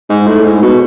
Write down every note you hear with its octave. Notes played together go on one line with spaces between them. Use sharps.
G#2
A2
G#2
B2